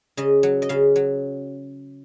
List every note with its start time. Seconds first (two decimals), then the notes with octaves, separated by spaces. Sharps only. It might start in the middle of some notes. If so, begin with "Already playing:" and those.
0.17 C#3 D#5
0.43 F#3
0.62 D#5
0.69 C#3 F5
0.96 F#3